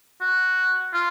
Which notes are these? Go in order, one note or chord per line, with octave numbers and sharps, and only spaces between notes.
F#4
F4